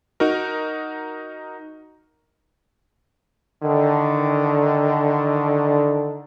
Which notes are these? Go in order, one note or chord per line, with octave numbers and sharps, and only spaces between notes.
D#4 F#4 A#4
D3 D#3